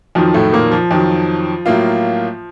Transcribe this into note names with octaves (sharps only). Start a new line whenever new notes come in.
F2 D#3 F3 F#3
A2 A3
A#2 A#3
F3
F2 D#3 F#3
A2 F#3 A#3 F4